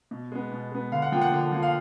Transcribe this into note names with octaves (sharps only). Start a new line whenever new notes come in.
B2
G#3 B3
B2
G#3 B3
D3 F5
F#5
F3 A#3 G5
F#5
D3
F3 A#3
F5